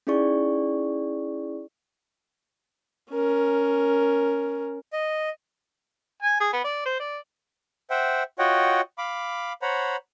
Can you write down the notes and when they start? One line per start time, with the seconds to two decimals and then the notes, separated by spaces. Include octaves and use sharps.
0.07 C#4 D#4 E4 G#4 D5 C#6
3.12 C#4 A#4
4.93 D#5
6.23 G#5
6.41 G#4
6.53 B3
6.64 D5
6.86 C5
7.00 D5
7.90 C5 E5 F#5 G5
8.39 F4 F#4 C#5 D#5 F#5 G5
8.98 F5 B5 D6
9.62 C5 C#5 F#5 A#5 B5